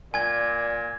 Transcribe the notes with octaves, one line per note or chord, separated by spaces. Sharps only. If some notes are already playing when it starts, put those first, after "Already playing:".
A#2 D5 G#5 G#6